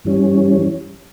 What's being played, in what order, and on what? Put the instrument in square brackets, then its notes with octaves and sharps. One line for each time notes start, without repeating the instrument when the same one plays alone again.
[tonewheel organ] G2 E3 G3 C#4